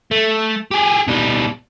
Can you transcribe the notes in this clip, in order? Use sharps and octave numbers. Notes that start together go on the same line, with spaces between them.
A3
G4 G#4
B2 G3